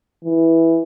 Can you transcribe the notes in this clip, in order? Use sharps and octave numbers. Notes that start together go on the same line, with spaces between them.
E3